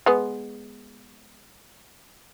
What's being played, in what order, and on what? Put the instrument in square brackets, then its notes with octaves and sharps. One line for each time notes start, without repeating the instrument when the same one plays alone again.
[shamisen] G#3 B3